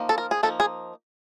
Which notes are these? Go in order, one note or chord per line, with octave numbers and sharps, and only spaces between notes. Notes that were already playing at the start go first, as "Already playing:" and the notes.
Already playing: F3 A#3 D#4
A4
A#4
G#4
F3 A#3 D#4 A4
G#4